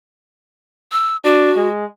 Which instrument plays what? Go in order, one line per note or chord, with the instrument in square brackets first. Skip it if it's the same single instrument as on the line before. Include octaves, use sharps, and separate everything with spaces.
[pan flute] E6
[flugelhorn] D4 [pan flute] F#4
[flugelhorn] G#3